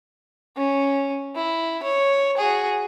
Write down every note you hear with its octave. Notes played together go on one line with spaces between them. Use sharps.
C#4
E4
C#5
F#4 G#4